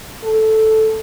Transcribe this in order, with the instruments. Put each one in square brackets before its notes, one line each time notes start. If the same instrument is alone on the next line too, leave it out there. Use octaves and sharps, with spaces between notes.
[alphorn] A4